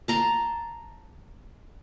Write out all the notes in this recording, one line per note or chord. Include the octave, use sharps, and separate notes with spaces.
A5 A#5 C6